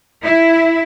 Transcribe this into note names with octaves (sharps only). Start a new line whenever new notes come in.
E4